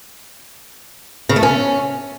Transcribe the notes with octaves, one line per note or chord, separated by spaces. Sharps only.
C#3
A3
C#4